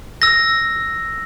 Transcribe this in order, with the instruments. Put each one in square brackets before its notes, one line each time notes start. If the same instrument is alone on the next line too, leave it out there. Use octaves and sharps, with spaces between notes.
[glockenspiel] E6 A#6